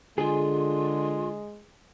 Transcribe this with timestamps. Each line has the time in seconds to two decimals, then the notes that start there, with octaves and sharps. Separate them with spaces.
0.18 D3 G#3 F4 G#4